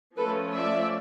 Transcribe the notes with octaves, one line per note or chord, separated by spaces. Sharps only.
F3 A3 C#4 A4 B4
D5 E5